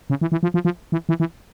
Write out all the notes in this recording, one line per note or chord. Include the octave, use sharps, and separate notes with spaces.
C#3
E3
E3
F3
F3
F3
E3
E3
E3